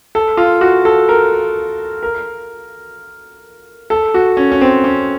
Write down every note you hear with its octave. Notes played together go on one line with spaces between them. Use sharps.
A4
F4
F#4
A4
A#4
A#4
A4
F#4
C#4
C#4
C4
C#4